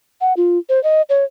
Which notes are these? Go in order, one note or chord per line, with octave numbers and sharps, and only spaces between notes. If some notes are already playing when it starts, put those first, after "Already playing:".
F#5
F4
C5
D#5
C#5